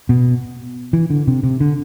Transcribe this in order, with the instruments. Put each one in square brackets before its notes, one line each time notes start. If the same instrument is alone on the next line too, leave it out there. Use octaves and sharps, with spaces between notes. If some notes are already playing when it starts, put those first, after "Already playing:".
[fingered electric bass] B2
E3
D3
C3
C3
D3